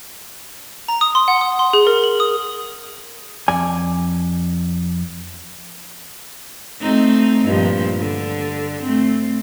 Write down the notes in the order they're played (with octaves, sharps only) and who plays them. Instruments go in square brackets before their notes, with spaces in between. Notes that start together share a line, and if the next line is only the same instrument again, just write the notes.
[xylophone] A#5
D#6
C6
F#5
D#6
C6
G#4
A#4
F#7
D#6
[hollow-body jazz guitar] F2 D5 G#5
[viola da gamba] A3 C4 D#4
G2 A#2 F3
D3
A3 C4